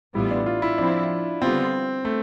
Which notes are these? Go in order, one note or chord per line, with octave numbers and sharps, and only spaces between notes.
A1 A2 G3 B3 E4 F4
D4
F4
E4
F3 C4 D4 E4
D3 G3 B3 C4 F4
A3